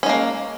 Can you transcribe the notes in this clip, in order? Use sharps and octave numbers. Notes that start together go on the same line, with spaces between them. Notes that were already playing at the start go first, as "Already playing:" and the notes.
G#3 A#3 C#4